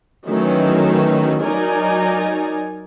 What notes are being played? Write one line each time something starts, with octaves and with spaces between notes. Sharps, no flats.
D#3 E3 F#3 A3 C#4
F#3 D#4 A#4 D5 G#5